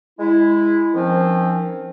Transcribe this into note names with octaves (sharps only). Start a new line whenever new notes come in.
G#3 E4
D#3 F3 C4 C#4